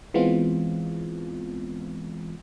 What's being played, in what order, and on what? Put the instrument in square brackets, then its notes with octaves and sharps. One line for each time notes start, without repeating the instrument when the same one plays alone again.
[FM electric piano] E3 G#3 B3 C4 F4